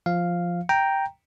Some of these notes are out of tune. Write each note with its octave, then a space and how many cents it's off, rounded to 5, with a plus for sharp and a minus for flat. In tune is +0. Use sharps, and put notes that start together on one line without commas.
F3 +0 F5 +0
G5 +0 A#5 +0